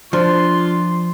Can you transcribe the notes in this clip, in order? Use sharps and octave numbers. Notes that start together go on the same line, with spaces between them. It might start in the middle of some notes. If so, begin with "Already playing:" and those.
F3 D4 F4 C6